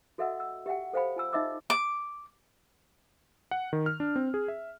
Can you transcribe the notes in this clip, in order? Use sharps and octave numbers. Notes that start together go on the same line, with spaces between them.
F#4 A4 D#5 E5 F#5 E6
E6
G4 E5 F#5 G5
A4 C5 F5 G5 B5
F4 G#5 E6
D#4 D#5 E5 B5 D6 E6
D6
F#5
D#3
F6
D4
C4
G#4
E5